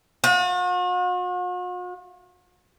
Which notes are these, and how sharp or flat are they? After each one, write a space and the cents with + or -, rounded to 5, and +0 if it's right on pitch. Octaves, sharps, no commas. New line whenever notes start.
F#4 -45